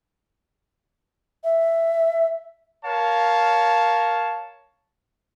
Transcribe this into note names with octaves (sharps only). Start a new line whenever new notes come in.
E5
A#4 C#5 F5 A5